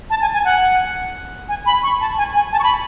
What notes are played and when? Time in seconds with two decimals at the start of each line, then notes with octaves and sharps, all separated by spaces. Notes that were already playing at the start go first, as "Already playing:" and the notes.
0.10 A5
0.21 G#5
0.33 G#5
0.45 F#5
1.49 G#5
1.66 B5
1.83 C#6
2.01 A5
2.18 G#5
2.35 G#5
2.52 A5
2.59 C#6
2.64 B5